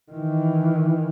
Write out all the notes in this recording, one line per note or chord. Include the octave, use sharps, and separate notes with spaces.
D#3 E3